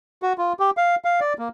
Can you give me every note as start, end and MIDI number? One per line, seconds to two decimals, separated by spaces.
0.23 0.33 66
0.38 0.53 65
0.59 0.70 67
0.77 0.95 77
1.05 1.20 77
1.20 1.33 74
1.38 1.48 58